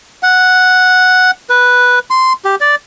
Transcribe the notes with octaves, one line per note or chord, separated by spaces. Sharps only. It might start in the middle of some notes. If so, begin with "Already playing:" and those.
F#5
B4
C6
G4
D5